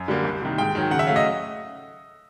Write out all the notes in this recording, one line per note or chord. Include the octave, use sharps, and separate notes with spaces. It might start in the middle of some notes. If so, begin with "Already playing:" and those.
Already playing: F#2
D3 G3 A#3
C2
C3 D#3
G#2 G5
D#3 F#3
C#3 F#5
E5
F#3 A3 F5
D#5